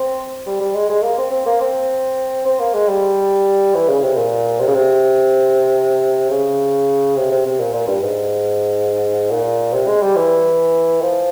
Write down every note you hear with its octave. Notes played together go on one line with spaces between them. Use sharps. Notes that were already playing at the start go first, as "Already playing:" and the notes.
Already playing: C4
G3
G3
G#3
G#3
A#3
C4
C4
A#3
C4
C4
A#3
G#3
G3
E3
C#3
C3
A#2
C3
C#3
C3
C#3
C3
C3
C3
A#2
A#2
G2
G#2
A#2
C3
G#3
G3
E3
F3